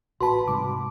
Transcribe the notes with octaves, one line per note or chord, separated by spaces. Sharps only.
A1 F#4 B4 A5 B5 C6
G#2 C3 G3 D6